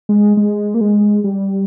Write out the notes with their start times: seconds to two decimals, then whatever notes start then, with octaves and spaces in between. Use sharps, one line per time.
0.09 G#3
0.37 G#3
0.74 A#3
0.81 G#3
1.24 G3